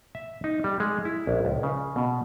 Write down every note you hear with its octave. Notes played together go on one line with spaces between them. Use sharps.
E5
D#4
G3
G#3
E4
A#1
C#2
C#3
B2